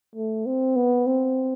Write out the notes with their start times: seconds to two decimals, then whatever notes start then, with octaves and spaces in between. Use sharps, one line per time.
0.16 A3
0.46 C4
0.76 B3
1.07 C4